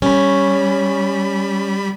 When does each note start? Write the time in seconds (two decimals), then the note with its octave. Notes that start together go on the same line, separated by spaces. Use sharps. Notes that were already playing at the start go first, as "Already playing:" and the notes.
0.02 G3 C#4 B5